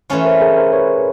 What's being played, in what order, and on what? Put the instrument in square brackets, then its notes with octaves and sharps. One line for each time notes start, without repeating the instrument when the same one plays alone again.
[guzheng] E3 A3 C#4 F4 [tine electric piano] C#5
[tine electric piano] A#4 C5
G#4 A#4
A#4 C5
B4 C#5